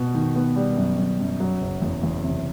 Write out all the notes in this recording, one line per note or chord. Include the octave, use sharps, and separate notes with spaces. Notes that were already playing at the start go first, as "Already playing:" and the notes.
Already playing: B2
D#3
B3
G3
F#2
F#2
F#2
F#3
F#1
E2
E2
C3